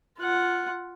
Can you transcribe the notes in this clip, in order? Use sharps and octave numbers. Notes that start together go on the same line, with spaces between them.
F4 F#5